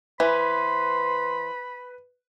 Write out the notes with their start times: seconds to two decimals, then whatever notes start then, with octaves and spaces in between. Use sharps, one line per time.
0.20 E3 B4 C5 B5